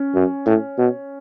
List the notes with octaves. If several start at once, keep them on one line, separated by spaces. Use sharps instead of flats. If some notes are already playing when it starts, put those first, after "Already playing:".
Already playing: C#4
F#2
A2
B2